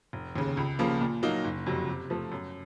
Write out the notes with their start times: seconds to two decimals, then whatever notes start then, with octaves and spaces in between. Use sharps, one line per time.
0.13 F1
0.36 D#2 C#3
0.57 C#2
0.79 C#3 F3 A#3
1.01 A#2
1.23 F#3 A#3 D#4
1.45 F#1
1.66 F2 C3 F#3
1.88 C3
2.10 F3 A3
2.32 F#2